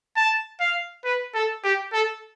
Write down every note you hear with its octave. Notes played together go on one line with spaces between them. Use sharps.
A5
F5
B4
A4
G4
A4